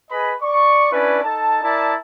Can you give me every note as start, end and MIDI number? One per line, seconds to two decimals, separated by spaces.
0.11 0.33 68
0.11 0.33 71
0.11 0.33 75
0.11 0.33 83
0.42 0.89 74
0.42 0.89 85
0.92 1.23 61
0.92 1.23 62
0.92 1.23 64
0.92 1.23 71
0.92 1.23 74
1.23 1.58 63
1.23 1.58 69
1.23 1.58 81
1.62 1.95 64
1.62 1.95 70
1.62 1.95 74
1.62 1.95 81